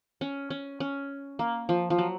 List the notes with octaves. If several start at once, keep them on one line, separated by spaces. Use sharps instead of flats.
C#4
C#4
C#4
A#3
F3
F3
F#3